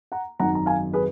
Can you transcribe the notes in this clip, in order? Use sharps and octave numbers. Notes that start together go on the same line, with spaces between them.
F#5 A#5
G#1 F#2 D#3 F#3 F#5 A#5
A#5
F5 G#5
G#4 B4